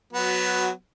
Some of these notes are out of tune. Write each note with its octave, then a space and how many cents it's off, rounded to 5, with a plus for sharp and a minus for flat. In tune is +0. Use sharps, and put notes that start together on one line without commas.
F#3 -15 B3 +0 F#4 +0